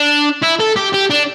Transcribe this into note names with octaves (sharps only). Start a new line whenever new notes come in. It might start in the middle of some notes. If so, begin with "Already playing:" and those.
Already playing: D4
E4
A4
G4
G4
D4